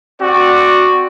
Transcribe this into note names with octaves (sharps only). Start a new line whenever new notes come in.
C4 F#4 D5